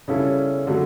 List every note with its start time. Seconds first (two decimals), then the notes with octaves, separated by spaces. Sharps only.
0.08 C#3 G3 C#4 E4 A4
0.67 D3 F#3 A3